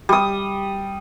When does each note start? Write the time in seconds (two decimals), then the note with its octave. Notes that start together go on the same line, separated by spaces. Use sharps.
0.09 G3 D#6